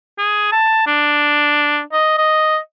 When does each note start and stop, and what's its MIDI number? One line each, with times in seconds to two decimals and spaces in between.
0.18 0.48 68
0.52 0.84 81
0.87 1.81 62
1.93 2.18 75
2.18 2.58 75